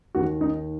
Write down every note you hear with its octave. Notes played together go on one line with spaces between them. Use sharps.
D#2 D#3 F#4
D#4